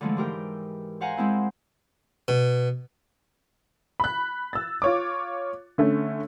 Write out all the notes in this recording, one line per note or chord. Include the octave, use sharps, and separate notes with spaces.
D3 E3 F3 G#3 A3
G#2 G4 A#4 G5
C5 F5 F#5 G#5 A#5
G#3 C4 E4 C5
B2
B5 F#6
E6 A6
F4 C#5 D6
D3 A3 C#4